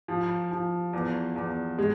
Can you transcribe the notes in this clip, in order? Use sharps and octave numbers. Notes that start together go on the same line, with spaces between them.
F3
F3
E2
E2
G#3